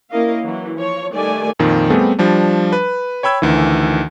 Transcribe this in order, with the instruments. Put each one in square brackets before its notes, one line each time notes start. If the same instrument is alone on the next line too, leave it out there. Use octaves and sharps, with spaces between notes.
[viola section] A#3 C#4 E4 A#4 D#5 F5
E3 F#3
F3 C#5
D#3 G3 A3 D5 G#5
[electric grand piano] F2 A#2 D#3
G3 A3 B3 C4 G4 G#4
F3 G3 D4
B4
C#5 G5 B5 E6 G#6
D2 D#3 E3